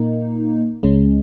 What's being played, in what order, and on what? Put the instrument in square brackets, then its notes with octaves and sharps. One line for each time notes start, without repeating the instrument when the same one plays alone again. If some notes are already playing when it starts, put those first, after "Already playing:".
Already playing: [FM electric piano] A#2 A#3 D#4
C#2 C#3 G#3 C#4